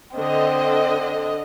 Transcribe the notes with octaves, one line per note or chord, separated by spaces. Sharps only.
D3 C4 D#5